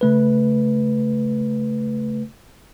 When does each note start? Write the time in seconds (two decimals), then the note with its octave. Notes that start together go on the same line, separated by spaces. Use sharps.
0.01 C#3 A3 B4